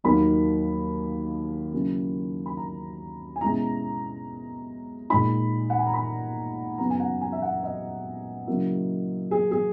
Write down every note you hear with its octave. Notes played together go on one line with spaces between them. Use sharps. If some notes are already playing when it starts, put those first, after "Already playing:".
D#2 D#3 F#3 A#3 D#4 B5
C#3 F#3 A#3 C#4 E4
B5
A#5
G#5
B2 G#3 C#4 E4 A#5
A#2 G#3 D#4 B5
F#5
G#5
A#5
B5
F#2 C#3 F#3 B3 A#5
G#5
F#5
G#5
E5
F#5
D#5
C#3 F#3 A#3 E4
G#4
G#4